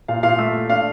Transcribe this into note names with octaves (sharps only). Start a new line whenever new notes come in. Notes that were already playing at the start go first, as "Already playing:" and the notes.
A#2 F5
A#2 F5
A3 E5
A3
D4 F5